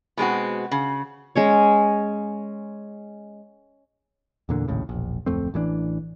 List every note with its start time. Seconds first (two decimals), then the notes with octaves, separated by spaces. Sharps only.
0.17 B2 G#3 C4 F#4
0.71 C#3
1.35 G#3 C#4 C#5
4.49 E2 A#2 D3
4.68 A#1 D#2 A2 C#3
4.89 E1 A#1
5.26 D1 F2 A3 C4
5.54 A1 E3 F#3 D4